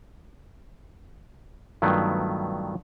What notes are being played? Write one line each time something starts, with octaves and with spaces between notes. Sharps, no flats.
G2 D#3 F#3 A3 B3 F4